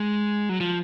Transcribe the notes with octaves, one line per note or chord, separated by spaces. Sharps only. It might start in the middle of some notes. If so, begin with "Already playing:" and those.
Already playing: G#3
F#3
F3